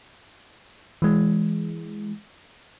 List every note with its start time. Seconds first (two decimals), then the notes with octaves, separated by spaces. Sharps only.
1.02 E3 G#3